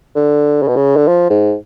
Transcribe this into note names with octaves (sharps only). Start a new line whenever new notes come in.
D3
C#3
B2
C#3
D3
F3
G#2